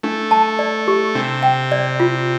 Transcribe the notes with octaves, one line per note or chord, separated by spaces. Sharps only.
A3 D4
A5
D5
G4
C3 D4
G5
D5
F4